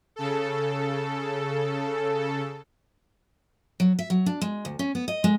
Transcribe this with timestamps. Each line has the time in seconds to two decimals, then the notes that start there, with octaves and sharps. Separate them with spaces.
0.16 C#3 A4
3.80 F#3
3.99 E5
4.10 F#3
4.26 D4
4.41 G#3
4.65 D2
4.79 C#4
4.95 B3
5.08 D#5
5.24 G#3